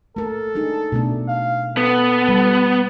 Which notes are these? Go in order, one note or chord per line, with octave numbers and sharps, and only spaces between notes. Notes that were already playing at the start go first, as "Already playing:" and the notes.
A3 A4 A#4
D4 D#4 G#4
B2 A3 D4
F5
B3 A4
G3